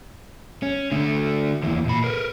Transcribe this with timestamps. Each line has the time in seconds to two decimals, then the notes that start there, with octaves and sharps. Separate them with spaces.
0.63 C#4
0.92 D3 A3
1.63 D#2 E3
1.86 A#2 B5
2.04 A#4 B4